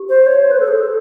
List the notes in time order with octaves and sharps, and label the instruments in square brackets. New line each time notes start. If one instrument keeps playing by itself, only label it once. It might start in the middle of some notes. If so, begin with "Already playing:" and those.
Already playing: [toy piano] G4
[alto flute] C5
C#5
C5
B4
A4
G#4
A4